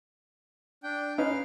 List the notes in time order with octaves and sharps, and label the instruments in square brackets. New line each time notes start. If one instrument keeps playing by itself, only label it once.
[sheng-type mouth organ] D4 G5
[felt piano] C#4 D#4 B4 [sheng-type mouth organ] F5 F6